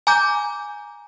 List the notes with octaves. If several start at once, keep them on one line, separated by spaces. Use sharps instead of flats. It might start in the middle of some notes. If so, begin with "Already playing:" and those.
G#5 A#5 D6 G6